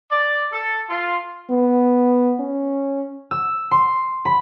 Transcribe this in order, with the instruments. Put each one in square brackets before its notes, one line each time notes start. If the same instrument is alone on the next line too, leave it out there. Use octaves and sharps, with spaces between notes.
[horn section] D5
A4
F4
[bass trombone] B3
C#4
[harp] E6
C6
B5